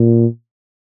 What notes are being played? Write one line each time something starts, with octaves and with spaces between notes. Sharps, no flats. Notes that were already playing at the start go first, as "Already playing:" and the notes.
Already playing: A#2